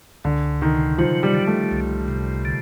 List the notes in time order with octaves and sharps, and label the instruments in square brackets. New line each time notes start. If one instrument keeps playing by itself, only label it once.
[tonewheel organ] C#2 [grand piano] D3
[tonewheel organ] C3 [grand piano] D#3
[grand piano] F3 [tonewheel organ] F#3
[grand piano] G3
[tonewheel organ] D3
[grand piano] A3
[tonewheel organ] C2
C3
D3